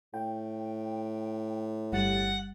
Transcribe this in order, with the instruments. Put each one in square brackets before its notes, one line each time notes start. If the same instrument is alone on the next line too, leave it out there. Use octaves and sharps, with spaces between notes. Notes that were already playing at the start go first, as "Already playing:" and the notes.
[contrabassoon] A2 [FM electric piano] G5
[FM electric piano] G1 G3 A6 [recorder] F#5